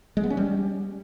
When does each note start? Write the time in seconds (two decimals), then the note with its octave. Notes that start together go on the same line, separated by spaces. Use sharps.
0.17 G#3
0.24 B3
0.30 C#4
0.37 G3